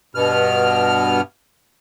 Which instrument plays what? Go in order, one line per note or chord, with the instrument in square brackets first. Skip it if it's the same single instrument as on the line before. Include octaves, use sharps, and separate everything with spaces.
[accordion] G2 B2 B3 F6